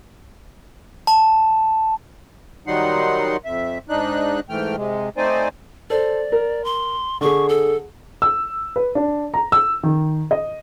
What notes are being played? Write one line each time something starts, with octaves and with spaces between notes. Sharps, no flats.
A5
D#3 F#3 G3 D#4 F#5 C6
F2 E5
G#2 D4 D#4 F#6
G#2 E3 A3 G5 F6
C3 G#3
A3 C4 D#4 C5 D5 G#5
A4 C5 D5
A#4
C6
D3 G#4 C#6
A4
E6
B4
D4
A#5
E6
D#3
D#5